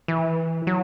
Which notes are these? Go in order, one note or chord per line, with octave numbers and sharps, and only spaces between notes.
E3
F#3